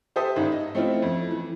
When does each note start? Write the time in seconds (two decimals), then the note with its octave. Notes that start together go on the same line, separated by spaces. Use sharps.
0.16 G4 A4 C5 E5 D#6
0.36 G#1 G#2
0.52 D#5
0.75 A3 C4 E4 F4
1.02 F2
1.31 E3